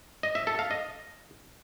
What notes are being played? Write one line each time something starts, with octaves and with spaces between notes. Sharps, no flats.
D#5
E5
A4
F5
D#5